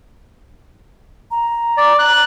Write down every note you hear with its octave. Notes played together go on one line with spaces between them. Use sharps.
A#5
D5
F#6